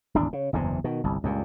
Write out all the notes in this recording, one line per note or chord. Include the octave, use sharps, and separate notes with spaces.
D1 G#1 E2 D4
C#3
F#1 E2 G2 C3
B2 D#3
G1 C2
C#2 G2 A#2